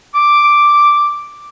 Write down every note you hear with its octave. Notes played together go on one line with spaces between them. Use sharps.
D6